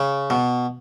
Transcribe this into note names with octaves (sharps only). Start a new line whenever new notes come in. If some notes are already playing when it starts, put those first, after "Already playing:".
Already playing: C#3
B2